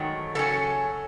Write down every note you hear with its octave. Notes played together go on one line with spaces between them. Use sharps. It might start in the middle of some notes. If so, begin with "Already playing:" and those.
Already playing: G#2 D#3 F#3 A3
C#3 F#3 C#4 A4